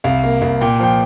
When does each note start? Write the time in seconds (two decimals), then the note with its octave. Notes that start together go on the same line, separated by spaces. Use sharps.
0.04 C2 F5
0.24 A#3
0.42 C2
0.61 A#2 G5
0.80 F3 G5